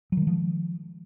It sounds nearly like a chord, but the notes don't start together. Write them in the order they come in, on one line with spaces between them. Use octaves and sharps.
F#3 D#3 G#3 F3